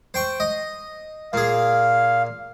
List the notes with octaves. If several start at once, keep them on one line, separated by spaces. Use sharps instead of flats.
C5 G5 C#6
D#5
A#2 G#4 F5